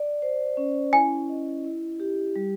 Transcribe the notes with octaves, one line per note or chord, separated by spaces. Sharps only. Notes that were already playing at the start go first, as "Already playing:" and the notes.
Already playing: D5
C5
C#4
E4 G#5
D#5
E4
G4
G3